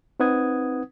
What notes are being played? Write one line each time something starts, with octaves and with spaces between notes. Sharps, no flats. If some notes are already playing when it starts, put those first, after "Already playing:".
C4 D#4 B4 F#5 D#6 G#6